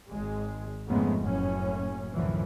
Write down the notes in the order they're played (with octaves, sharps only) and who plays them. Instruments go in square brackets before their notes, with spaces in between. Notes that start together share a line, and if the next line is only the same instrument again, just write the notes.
[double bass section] G#1 G#3
F2 G#2 C#3 G#3 A3 B3
F#1 F#2 A2 C#4
C2 F#2 A2 D3 E3 F3